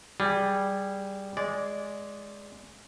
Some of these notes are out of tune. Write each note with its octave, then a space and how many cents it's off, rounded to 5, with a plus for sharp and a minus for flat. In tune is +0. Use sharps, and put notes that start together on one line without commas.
G3 +0 G#4 -15
G#3 +0 D5 -20